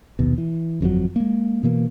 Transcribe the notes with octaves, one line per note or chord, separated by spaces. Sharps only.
A#1 D#2 B2
E3
G1 F2 C#3 F#3
G#3 A#3
B2 E3 A#3